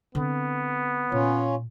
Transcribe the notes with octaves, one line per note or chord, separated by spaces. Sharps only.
D3 B3 C4
A#2 C#4 F4 C#5